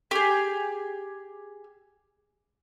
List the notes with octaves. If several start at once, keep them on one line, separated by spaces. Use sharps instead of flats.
G4 G#4